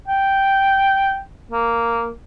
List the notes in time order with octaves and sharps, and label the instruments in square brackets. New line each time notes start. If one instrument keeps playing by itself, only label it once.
[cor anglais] G5
A#3